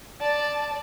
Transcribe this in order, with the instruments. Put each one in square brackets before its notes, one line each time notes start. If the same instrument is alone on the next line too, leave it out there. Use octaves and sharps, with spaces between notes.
[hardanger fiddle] D5 [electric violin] A5